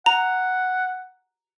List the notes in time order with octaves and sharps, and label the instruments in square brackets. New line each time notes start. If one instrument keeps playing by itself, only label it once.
[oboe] F#5 [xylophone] A#5